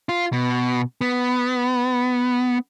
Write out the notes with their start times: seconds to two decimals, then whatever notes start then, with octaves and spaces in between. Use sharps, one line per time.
0.09 F4
0.33 B2
1.01 B3